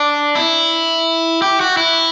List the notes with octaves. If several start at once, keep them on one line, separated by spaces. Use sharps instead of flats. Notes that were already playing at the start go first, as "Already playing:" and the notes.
Already playing: D4
E4
G4
F#4
E4